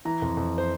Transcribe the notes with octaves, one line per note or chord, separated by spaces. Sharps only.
E3 A#5
F2
F2
C5